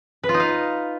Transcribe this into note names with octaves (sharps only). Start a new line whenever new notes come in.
B4
F4
D#4
F5